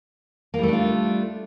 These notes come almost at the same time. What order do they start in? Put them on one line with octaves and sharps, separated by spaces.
A#3 G3 A3 D4 F4